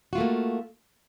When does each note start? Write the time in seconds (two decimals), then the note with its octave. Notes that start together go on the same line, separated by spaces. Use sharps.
0.13 F#4
0.15 F4
0.18 A3
0.20 A#3